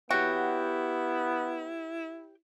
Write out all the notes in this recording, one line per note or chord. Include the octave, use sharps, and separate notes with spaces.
B3 E4 F#4 G4 C#5 G5